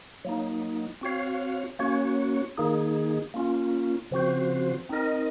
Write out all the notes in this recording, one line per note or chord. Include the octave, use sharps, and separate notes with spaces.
F#3 A#3 D#4
C4 F#4 C#5 F5
A#3 C#4 F#4 C#5
D#3 A#3 D#4 G#4
A#3 C#4 F4
C#3 F3 C4 F#4 C5
C4 D#4 A#4 D#5